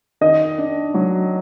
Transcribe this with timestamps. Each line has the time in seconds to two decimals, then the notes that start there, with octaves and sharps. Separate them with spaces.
0.21 D#3 D#5
0.58 D4
0.94 F#3